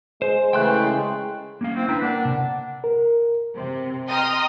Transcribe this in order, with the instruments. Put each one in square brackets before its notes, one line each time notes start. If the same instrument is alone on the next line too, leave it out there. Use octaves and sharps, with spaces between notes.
[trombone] G#3 [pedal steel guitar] C5
[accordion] C#3 E3 A3 [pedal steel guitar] G5 C6 F#6
[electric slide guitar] A#3 C#4 F5
[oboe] C4 [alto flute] E4
[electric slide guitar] D4 G5 A#5 [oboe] B4
[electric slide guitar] A#3 A#4 [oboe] D4 [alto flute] F#5
[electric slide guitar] C3
[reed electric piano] A#4
[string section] C3
D#5 G5 A#5 C6 D#6 F6